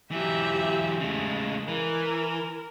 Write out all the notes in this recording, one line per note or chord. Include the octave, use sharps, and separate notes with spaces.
E3 F#3 G4 E5
C#3 G#3 A3
E3 A#4